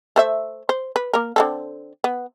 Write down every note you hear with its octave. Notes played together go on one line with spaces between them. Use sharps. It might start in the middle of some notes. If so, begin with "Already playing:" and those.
A3 C5 E5
C5
B4
A#3 A#4
D3 C4 A4
B3